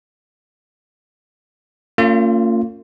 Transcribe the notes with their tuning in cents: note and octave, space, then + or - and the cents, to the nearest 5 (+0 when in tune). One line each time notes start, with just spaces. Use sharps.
A#3 -45 C#4 +0 F4 +0